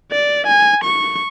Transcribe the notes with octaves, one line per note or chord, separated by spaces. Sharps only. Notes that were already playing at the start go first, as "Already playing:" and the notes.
D5
G#5
C#6